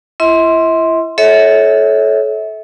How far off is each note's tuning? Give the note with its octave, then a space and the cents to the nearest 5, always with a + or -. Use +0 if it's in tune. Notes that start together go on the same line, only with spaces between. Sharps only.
E4 +35 E5 -45 C6 +0
A4 -25 C#5 +0 E5 -30